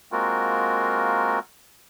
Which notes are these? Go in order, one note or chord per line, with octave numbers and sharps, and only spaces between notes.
G#3 A#3 C4 F4 F#4 A#4